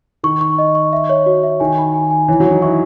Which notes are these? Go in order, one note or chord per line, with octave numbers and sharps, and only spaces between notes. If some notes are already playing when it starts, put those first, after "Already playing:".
D#3 C#6
C#6
D#5
C#6
E5
C#5
F#4
E5
D#3 G#5
B5
G#5
G#5
E3 C#5
F#3
C#5
D#4
E4 C#6